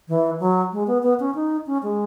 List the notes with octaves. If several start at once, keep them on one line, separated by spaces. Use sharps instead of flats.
E3
F#3
G#3
B3
B3
C#4
D#4
C#4
G#3